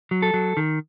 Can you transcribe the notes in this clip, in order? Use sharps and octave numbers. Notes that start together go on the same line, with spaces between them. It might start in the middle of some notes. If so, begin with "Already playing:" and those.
F#3
A4
F#3
D#3